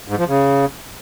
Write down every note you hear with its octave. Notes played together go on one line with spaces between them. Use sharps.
G#2
F3
C#3